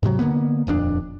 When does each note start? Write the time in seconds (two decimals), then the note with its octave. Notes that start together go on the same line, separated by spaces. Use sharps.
0.03 G#2 C3 E3 F#3
0.19 D3 E3 A#3 B3
0.67 D#1 F2 C#4 D4